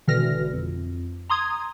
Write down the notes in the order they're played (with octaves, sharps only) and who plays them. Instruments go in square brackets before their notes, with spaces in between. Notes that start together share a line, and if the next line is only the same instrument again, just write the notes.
[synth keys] G#1 B2 D3 E3 F6 A#6
F2
A#5 C6 D#6 G#6